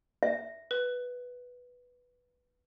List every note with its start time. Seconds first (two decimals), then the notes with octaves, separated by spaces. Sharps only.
0.23 E5
0.71 B4